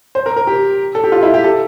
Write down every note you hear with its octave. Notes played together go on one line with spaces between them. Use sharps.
C5
A#4
A#4
G4
A4
G4
F4
E4
G4
A4